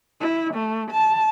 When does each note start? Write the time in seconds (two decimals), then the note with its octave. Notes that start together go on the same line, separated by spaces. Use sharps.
0.20 E4
0.54 A3
0.91 A5